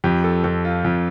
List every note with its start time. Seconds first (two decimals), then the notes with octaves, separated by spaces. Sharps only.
0.04 F2 G4
0.24 A4
0.44 F2 A4
0.65 F4
0.85 F2